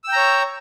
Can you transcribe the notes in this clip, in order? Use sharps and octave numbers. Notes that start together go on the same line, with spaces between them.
C#5 G5 A#5 E6